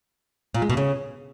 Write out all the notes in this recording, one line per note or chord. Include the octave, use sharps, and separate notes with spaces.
A#2
G#3
B2
C#3